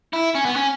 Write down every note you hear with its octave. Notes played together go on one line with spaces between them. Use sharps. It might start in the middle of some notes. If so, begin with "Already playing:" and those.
E4
C#4
B3
C#4